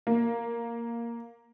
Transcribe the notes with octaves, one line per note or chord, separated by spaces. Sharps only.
A#3